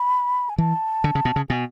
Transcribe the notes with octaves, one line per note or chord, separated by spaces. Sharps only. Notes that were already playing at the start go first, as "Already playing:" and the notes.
Already playing: B5
G#5
E3 A5
D3
C#3
B2
C#3
B2 G#5